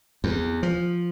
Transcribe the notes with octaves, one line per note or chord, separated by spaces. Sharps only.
E2
F3